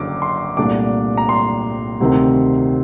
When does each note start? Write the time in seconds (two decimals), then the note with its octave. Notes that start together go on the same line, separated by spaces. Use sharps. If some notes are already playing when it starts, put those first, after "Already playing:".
Already playing: F#1 F#2 D3 D6
0.22 C6
0.57 C2 A#2 A3 D4 D6
1.17 A#5
1.29 C6
2.01 D2 C3 D#3